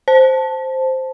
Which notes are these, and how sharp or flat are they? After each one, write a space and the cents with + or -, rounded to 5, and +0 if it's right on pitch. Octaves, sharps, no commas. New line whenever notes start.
C5 +0 A5 +0